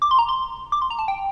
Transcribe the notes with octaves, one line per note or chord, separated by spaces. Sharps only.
D6
C6
A#5
C6
D6
C6
A#5
A5
G5